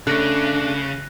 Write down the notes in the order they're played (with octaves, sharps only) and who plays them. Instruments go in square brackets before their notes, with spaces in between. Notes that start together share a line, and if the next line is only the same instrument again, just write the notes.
[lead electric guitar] C#3 [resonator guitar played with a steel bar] A3 A4 [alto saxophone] D4 [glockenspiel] F#6 A#6